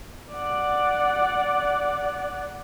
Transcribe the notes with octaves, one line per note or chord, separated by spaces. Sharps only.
D5 F#5